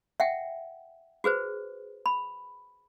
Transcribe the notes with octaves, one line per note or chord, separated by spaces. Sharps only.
E5 F#5 G5
F#4 G#4 B4 C5
B5